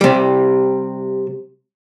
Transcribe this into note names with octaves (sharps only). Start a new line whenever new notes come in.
C3 G3